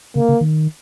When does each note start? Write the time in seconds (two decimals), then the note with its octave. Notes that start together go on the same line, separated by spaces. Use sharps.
0.16 C#3 A#3
0.29 C#3
0.41 D#3